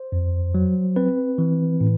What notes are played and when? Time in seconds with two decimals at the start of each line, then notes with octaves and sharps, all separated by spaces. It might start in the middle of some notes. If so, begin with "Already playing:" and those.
Already playing: C5
0.12 F2
0.55 F#3
0.96 C4 B4
1.38 E3
1.81 A2